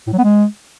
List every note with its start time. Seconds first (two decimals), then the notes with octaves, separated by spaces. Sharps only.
0.07 A2
0.13 F#3
0.18 B3
0.24 G#3